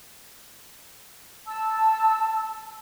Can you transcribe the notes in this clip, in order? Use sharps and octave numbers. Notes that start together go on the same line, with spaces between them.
A5 E6